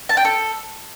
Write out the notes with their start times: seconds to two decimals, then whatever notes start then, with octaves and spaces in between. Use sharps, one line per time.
0.09 A5
0.17 G5
0.25 A4